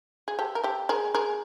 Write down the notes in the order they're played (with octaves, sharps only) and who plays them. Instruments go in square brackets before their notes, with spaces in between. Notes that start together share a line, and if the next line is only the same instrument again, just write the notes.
[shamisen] G#4
G4 A4
A#4
G4 A4
G#4 A#4
G#4 A#4